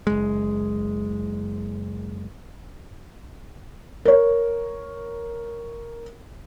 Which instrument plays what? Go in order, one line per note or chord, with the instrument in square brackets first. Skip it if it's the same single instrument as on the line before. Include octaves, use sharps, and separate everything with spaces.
[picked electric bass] F#1 G#3
[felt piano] A#4 C#5